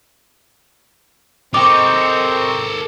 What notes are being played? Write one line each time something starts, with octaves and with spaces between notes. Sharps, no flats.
C4 A4 A#4 D#5 G5 C#6 D6